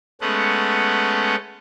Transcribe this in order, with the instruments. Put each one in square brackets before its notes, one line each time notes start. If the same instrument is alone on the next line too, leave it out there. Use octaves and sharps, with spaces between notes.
[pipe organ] G#3 A3 B3 C#4 A4 F#5